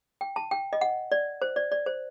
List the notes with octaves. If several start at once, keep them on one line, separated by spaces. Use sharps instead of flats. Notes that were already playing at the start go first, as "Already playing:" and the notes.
G5
A5
G5
D#5
F#5
D5
C5
D5
D5
C5